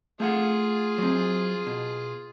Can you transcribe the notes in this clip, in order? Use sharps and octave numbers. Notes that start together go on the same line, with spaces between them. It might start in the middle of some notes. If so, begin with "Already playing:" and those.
A3 F4 G#4 F5 F#5
F#3 C4
B2